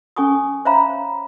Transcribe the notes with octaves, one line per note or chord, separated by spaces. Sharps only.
C#4 A4 G#5 C#6 D#6
C5 C#5 E5 F5 A#5 B5